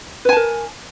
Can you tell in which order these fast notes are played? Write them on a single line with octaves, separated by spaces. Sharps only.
B4 G#5 A5 A#4